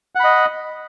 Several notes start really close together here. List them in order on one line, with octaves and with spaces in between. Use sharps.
F#5 B5 D#5